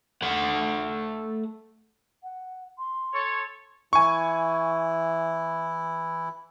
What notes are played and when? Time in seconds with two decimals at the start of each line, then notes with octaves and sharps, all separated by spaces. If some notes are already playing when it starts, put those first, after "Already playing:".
0.23 A3 F#5
2.23 F#5
2.78 C6
3.14 A4 C#5
3.93 E3 E4 G#5 C#6